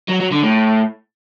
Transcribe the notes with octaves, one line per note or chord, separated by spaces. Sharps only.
F#3
F#3
D3
A2